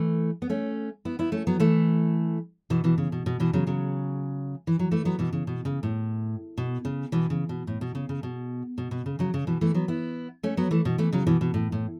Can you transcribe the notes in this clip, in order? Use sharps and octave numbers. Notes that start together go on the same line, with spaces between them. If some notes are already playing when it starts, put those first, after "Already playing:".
Already playing: E3 A3
B3
A3 C#4
B3 E4
B3 E4
A3 C#4
F#3 B3
E3 A3
B2 E3
B2 E3
C#3
B2
B2
B2 E3
C#3 F#3
C#3 F#3
E3
F#3
E3 A3
F#3 B3
B2 E3
C#3
B2
C#3
A2
B2
C#3
B2 E3
C#3
B2
A2
B2
C#3
C#3
B2
B2
B2
C#3
C#3 F#3
C#3
B2 E3
E3 A3
F#3 B3
B3 E4
A3 C#4
F#3 B3
E3 A3
B2
E3 A3
C#3 F#3
B2 E3
B2
A2
A2